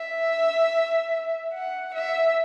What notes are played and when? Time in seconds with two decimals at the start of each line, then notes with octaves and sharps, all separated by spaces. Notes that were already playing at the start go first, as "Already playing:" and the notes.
Already playing: E5
1.54 F#5
1.94 E5